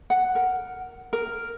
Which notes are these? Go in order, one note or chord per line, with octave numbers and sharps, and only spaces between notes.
F#5
A#4
A#4